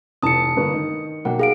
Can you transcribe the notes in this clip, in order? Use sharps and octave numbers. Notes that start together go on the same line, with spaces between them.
F1 E3 A5 D#6 C#7
G1 A#3 B4
D#3
B1 A#3 F#5 G5
G#4 F5 D7